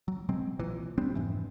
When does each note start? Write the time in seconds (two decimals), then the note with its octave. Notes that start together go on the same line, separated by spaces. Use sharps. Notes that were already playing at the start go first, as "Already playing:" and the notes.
0.08 F#3
0.29 B2 F#3 G#3 C4
0.59 B1 A#2 E3
0.98 G3 B3 C4 D4
1.15 F1 G#2 E3